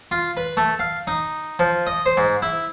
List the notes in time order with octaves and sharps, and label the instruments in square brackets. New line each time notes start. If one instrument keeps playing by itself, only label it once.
[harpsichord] F4
B4
A3
F5
D#4
F3
D#5
C5
G#2
E4